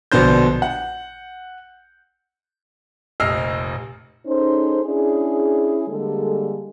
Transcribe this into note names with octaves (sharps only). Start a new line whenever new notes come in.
A#1 B2 D3 C5 G6
F#5
F1 A#1 D#5 E6 F6 C7
C#4 D#4 G#4 A4 C5
C#4 D4 E4 G#4
D3 G3 G#3 A#3 A4